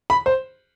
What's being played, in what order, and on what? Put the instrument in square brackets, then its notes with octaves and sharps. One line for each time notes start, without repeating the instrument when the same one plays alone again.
[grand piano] B5
C5